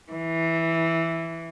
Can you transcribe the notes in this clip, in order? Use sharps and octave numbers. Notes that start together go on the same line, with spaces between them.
E3